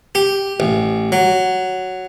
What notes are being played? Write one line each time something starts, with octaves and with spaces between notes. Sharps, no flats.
G4
A1
F#3